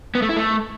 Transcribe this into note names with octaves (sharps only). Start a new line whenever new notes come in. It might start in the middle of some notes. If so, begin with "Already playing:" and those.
B3
A3
E4
A3